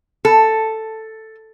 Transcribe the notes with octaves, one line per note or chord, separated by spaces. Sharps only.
A4